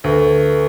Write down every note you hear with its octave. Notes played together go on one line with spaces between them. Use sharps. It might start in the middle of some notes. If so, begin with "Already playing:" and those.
D2 A4 B4